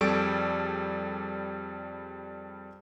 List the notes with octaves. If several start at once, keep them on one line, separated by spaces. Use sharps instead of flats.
F2 G3 G#4 A4 C#6 D7